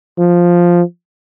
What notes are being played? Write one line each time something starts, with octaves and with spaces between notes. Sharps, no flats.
F3